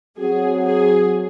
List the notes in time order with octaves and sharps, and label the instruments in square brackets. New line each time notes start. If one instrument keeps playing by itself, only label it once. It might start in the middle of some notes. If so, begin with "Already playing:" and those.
[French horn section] F#3 C4 F#4 [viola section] G#4
[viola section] G#4